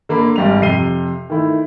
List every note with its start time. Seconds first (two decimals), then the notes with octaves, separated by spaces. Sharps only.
0.09 D3 A#3 A#5 B5
0.36 G#1 G3 F7
0.61 F2 C3 C7 D#7 G7
1.30 D#3 A3 E4